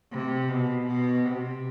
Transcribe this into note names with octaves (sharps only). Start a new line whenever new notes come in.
C3
B2
B2
C3